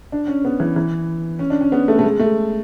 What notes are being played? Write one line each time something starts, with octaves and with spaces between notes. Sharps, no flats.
D4
C#4
B3
E3
E3
C#4
D4
C#4
B3
A3
A3
G#3
A3